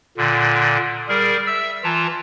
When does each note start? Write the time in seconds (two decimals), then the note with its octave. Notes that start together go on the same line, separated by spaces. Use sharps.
0.17 A#2 D3
1.09 G3 G#4 A#4
1.47 E5 E6
1.84 E3 F4 A5 A#5